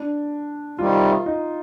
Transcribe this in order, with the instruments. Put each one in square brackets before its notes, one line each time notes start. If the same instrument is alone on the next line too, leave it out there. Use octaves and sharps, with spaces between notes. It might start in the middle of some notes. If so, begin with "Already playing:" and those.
Already playing: [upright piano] D4
[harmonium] C3 D#3 G3 [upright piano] F4
[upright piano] D#4